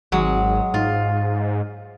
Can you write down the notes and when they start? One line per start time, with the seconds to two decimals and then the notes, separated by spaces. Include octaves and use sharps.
0.12 G#1 F#3 G#3
0.74 G#2 F4